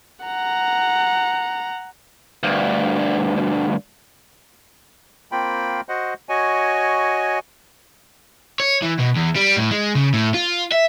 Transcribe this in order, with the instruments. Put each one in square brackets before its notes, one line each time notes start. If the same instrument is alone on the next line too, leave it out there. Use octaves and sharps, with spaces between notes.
[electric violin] F#5 A#5
[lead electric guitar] D2 G2
[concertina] A#3 C4 F4 G5 B5
F#4 C5 D#5 F#5
F#4 C#5 D#5 G#5
[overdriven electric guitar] C#5
E3
B2
E2
G3
A2
G#3
C#3
A2
F4
E5